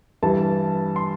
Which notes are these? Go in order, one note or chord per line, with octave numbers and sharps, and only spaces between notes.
G2 E3 G3 A5
C6